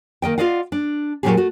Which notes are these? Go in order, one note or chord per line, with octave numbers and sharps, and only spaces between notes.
D#3 A#3 D#5 G5
F4 G#4 D5 D#5 F5 F#5
D4
A#2 D3 F#3 A3 G4 G#4
A3 F#4